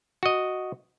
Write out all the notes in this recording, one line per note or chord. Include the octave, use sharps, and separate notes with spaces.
F#4 D#5